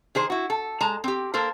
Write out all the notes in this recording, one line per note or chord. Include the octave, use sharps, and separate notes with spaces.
D#3 G#4 C5
E4 F#4
A4
G#3 A5 A#5
C4 G4
A#3 A4 A#4 C5